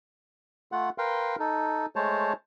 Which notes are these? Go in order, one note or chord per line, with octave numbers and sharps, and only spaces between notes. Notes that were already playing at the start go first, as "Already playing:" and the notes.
A3 F4 F#5
A#4 B4 F5 G5 C6
D#4 A4
G#3 A3 C5 C#5 A5